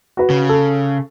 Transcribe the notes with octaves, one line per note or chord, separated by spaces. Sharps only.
F#4 B4
C#3
A4